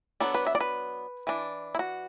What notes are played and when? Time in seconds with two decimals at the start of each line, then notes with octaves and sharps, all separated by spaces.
0.20 F#3 B3 D4 A4
0.34 B4
0.47 E5
0.55 D5
0.60 B4
1.27 E3 D4
1.75 E4
1.79 F#4